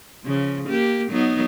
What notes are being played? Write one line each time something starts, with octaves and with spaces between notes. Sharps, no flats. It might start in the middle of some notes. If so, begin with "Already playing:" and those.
C#3 F3
A#3 G4
F#3 B3 D#4